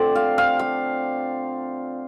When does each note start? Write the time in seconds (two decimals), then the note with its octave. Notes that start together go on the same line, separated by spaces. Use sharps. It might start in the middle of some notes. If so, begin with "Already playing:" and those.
Already playing: D3 F3 A3 C4 C5 D5
0.15 F5
0.38 F5
0.59 F5